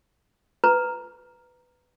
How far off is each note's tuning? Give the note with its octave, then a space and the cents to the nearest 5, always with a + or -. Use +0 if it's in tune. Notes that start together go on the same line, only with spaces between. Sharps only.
B4 +10 A#5 +0